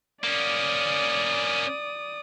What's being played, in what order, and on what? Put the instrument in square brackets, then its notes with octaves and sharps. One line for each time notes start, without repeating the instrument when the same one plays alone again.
[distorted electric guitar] A#3 C#4 [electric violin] D5 D#6